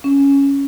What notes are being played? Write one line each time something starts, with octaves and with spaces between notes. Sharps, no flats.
C#4